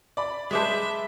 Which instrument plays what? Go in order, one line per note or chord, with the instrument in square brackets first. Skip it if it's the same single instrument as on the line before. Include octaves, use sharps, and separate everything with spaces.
[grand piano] D5 B5
[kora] G#3 B4 C5 [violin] E5 [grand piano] A5 D6 B6